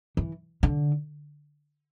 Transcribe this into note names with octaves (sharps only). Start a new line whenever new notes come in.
E3
D3